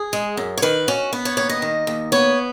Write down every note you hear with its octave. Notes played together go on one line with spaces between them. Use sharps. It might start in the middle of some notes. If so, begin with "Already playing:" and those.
Already playing: G#4
G#3
F#2
C#5
D#3 B4
C#4 F#4
B3
C#5
D#2 C#5
D#5
D#3
D#2
B3 C#5